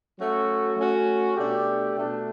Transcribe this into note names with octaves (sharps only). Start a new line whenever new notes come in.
F#3 A3 C#4 F#4
A3 C#4 F#4
B2 A3 D4 G4
B2 A3 D4